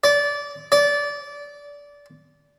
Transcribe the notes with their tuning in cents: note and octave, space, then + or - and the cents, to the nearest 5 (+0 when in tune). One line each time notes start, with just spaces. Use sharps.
D5 -20
D5 -20